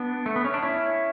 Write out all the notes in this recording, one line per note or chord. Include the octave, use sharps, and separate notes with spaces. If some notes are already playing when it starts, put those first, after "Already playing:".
Already playing: B3 D4
A3
B3
C#4
D4
C#4 E4